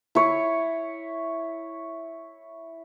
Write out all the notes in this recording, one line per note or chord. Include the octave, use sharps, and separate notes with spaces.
E4 C#5